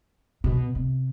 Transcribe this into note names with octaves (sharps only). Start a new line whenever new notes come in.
B2
C3